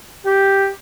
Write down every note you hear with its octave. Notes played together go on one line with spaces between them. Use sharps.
G4